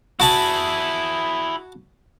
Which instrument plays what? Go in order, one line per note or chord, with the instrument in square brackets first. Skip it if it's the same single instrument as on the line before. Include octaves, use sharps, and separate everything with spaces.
[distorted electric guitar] E4 G#4 [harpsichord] F#4 A5 B5